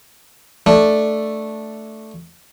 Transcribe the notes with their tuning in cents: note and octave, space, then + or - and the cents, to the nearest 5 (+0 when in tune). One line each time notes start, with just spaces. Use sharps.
A3 +0 D4 +0